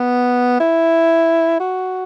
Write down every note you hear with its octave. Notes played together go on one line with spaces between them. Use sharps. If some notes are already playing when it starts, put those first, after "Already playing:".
Already playing: B3
E4
F#4